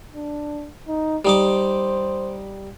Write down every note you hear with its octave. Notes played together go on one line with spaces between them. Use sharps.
D4
D#4
G3 D#4 C5 D6